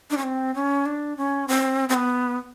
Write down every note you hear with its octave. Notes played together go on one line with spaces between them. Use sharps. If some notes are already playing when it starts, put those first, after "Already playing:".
D4
C#4
C4
C#4
D4
C#4
C4
C4
B3